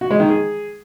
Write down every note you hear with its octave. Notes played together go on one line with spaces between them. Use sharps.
F#4
G#3
D#3
G#4